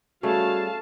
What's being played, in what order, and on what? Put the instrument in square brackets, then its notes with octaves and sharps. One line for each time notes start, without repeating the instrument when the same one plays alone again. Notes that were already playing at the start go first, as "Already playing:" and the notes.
[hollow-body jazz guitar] G3 C#4 G#4 [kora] A3 [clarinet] F#4 [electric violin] F5 A5